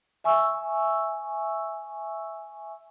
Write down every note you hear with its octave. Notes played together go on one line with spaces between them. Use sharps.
E5 G#5 C#6 E6